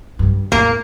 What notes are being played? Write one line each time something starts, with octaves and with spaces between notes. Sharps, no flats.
G2 C#3
E2 A2 A#3